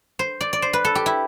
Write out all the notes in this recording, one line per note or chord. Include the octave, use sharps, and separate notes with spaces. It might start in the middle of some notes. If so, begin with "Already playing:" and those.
C5
D5
D5
C5
B4
A4
G4
E4